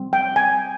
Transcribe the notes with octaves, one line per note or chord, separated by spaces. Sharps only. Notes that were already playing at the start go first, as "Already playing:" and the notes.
Already playing: G3 C4
G5
G#5